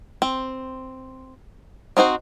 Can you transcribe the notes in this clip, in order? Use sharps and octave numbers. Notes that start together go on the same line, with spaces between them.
C4
C4 D#4 F#4 C5